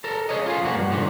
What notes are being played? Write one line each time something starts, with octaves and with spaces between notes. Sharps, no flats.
A4 A#4
G#4 B4 C#5 D#5
F4 G#4
F2 A#3 F#4
G2
C2 D3 D#3 F3